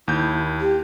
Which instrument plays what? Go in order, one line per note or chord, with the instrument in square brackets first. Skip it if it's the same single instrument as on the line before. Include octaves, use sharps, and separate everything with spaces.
[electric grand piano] D#2 G6 [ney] E4
[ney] G4